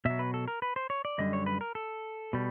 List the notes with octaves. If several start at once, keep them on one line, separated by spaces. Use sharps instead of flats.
B2 F#3 E5
B4
A4
A#4
B4
C5
C#5
D5
F#2 D3 G3 D#5
C#5
B4
A#4
A4
B2 G3